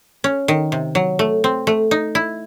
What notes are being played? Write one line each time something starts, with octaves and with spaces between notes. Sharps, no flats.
C#4
D#3
C3
F#3
A3
C4
A3
D#4
E4